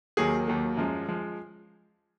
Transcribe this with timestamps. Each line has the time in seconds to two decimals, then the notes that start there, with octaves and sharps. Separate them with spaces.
0.17 D#2 D#3 F#3 A#3 G#4
0.48 D#2 D#3 F#3 A#3
0.77 F#2 F3 G#3
1.08 F3 G#3